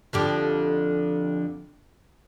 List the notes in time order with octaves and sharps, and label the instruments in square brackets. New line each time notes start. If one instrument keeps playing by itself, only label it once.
[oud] F2 D3 G4